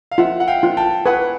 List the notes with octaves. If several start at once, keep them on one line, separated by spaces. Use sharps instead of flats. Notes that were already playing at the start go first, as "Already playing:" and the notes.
F5
F4 E5 F#5
F#5
F5 G5
F4
G5 A5
B4 F#5 G#5